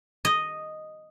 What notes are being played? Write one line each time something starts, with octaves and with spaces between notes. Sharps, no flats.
D#5